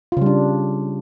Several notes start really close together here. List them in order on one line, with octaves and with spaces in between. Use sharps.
F4 C#3 G3 D4